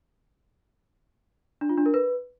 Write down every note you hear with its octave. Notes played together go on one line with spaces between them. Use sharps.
D4
F4
D4
A#4
B4